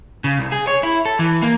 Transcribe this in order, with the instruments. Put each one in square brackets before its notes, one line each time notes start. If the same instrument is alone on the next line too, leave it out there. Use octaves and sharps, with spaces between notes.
[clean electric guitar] C#3
C2
G#4
C#5
E4
A4
E3
A#3